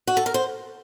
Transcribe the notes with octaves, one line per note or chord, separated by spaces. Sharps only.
F#4
A4
A#4
C5